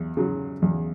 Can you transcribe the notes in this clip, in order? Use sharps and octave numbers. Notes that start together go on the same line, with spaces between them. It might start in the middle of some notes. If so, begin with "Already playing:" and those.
Already playing: E2
C#3 F#3
E2